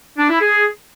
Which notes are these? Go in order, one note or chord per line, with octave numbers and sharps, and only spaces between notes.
D4
E4
G#4